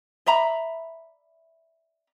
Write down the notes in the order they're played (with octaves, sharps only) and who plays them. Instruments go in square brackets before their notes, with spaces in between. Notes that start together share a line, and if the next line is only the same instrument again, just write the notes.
[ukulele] D5 E5 A#5 B5